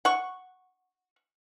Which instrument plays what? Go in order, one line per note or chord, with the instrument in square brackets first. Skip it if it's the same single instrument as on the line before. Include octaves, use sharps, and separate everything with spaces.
[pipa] F#5 C#6